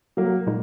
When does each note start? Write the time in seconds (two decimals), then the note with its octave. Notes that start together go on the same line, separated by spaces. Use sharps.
0.17 F#3 A#3
0.47 A#2 G#3 D#4